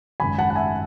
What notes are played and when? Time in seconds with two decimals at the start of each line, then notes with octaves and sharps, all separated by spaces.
0.20 G#1 F#2 C#3 G#5 B5
0.38 F#5 A5
0.50 F#5
0.56 E5 G#5